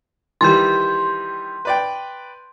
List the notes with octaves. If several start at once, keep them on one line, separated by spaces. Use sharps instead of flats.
D#3 E3 G3 C6 G6
B4 D5 G5